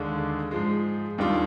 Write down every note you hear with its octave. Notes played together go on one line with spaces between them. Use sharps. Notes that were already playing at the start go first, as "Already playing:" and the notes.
Already playing: D#2 D3 G#3 D4
G#2 F3 G#3
D#2 D#3 G3 D4 F4